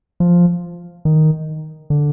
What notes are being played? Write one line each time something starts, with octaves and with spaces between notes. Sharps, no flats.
F3
D#3
D3